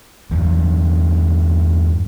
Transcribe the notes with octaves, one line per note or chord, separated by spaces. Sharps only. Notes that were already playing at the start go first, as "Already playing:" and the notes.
E2 G2